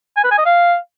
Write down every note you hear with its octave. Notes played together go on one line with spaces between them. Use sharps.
G#5
B4
G#5
D#5
F5